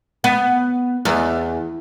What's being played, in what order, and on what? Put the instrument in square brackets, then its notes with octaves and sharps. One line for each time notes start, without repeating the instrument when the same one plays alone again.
[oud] B3
E2